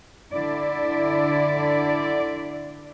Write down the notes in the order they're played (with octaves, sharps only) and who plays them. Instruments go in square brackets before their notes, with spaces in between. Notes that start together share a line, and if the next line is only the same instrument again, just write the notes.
[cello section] D3 E4 D5